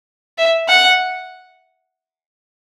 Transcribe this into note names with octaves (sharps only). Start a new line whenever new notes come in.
E5
F#5